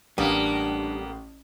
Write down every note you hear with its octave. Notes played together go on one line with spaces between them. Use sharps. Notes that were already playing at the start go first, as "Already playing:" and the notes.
A1 G3 A#3 B3 D4 D#6